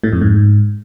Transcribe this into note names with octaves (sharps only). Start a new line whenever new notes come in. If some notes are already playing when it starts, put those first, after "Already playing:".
A2
F2
G#2